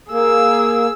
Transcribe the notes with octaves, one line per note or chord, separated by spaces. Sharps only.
A#3 G#4 E6